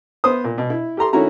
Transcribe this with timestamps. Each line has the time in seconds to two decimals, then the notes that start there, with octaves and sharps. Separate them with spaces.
0.24 B3 C5 D#6
0.44 A#2
0.58 B2
0.70 E4
0.97 G4 A4 A#5 C6
1.13 D#3 A3 C#4 E4 F#4 A#5